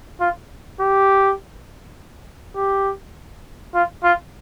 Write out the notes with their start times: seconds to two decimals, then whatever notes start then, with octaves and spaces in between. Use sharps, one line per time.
0.20 F4
0.80 G4
2.56 G4
3.74 F4
4.04 F4